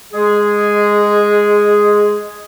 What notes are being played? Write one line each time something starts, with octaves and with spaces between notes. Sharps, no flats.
G#3 G#4